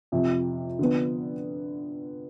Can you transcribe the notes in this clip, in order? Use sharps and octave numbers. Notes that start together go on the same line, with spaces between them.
F2 C3 F3
D3 F3 B3